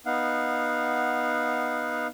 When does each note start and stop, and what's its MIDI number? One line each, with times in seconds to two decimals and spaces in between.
0.06 2.07 59
0.06 2.07 63
0.06 2.07 77
0.06 2.07 78